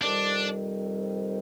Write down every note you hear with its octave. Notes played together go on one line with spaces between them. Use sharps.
F2 C3 D#3 G3 D4